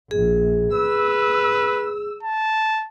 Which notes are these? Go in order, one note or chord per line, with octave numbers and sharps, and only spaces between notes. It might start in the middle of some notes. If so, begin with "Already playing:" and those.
A#1 G#4
B4 E6
A5